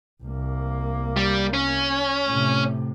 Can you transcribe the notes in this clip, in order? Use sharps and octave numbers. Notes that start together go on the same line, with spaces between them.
C2 A#3
G3
C#4
A2 C3